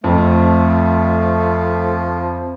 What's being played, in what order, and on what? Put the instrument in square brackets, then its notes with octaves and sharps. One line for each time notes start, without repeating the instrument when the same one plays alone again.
[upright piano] F2 [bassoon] F3 [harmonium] A3